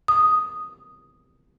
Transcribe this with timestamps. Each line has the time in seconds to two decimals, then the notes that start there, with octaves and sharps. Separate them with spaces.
0.08 D#6